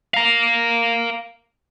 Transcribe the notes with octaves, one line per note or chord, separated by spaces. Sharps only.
F5 A#5